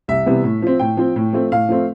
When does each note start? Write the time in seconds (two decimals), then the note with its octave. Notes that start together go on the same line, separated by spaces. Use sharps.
0.08 C2 E5
0.26 C3 E3 G3 B3
0.44 A2
0.62 F3 C4
0.80 A2 G5
0.97 F3 C4
1.16 A2
1.33 F3 A3 C4
1.52 A2 F5
1.69 F3 A3 C4